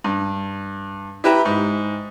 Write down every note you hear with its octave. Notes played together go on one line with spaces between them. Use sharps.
G2
E4 G4 B4 E5 G5 A#5
G#2